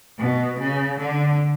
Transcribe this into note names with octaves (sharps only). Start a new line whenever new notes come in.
B2
C#3
D3